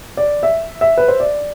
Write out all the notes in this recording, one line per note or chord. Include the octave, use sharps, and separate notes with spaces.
D5
E5
E5
B4
C5
D5